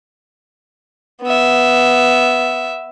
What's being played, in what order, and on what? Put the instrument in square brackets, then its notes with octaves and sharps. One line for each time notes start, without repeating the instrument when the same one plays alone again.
[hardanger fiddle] B3 E5